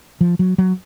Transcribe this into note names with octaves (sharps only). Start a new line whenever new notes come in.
F3
F#3
F#3